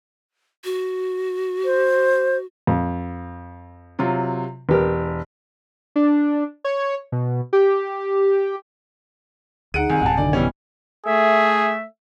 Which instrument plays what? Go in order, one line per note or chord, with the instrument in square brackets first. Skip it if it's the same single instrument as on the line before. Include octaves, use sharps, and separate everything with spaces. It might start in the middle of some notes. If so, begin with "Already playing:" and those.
[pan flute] F#4
[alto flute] C5
[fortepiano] F2
[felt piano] C3 F#3 F4
[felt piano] E1 [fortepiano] B3 G4 A#4
[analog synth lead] D4
C#5
B2
G4
[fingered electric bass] D2 [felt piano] D#4 G#4 [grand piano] F#5 D7 D#7
[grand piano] C2 [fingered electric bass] D#3 [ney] G#5
[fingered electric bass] A1 F#2 C3 [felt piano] F#5 A5
[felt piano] D2 D3 D#3 [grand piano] D5
[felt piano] B2 [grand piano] E3 G3 C#4
[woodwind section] A3 E5 [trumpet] G#4